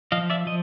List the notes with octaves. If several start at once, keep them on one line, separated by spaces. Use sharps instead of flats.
F3 D#5 F5
D5 E5
F3 D#5